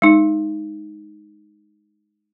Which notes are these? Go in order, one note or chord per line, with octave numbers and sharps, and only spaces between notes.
G#3 D#4